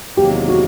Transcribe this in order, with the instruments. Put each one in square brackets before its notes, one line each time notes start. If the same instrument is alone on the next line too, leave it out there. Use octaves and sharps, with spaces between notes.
[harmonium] E2 C3 D#3 F#3 A#3 [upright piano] G4
[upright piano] F#4